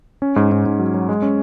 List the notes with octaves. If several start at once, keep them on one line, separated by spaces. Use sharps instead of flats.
C#4
G#2
G#2
G#2
F#3
F#3
G#3
C#4